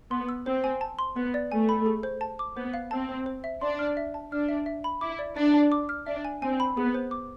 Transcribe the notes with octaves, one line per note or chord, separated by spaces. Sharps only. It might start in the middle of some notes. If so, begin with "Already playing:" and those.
B3 C6
E6
C4 C5
G#5
A5
C6
B3 B4
D5
A3 G#5
B5
G#4
C5
A5
D6
B3 C5
F5
C4 A5
C5
C5
E5
D4 C6
F6
E5
A5
D4 F6
E5
E5
B5
E4 D6
D5
D4 D5
A5
D6
F6
D4 E5
G#5
C4 G#5
B5
B3 G#4
C5
D6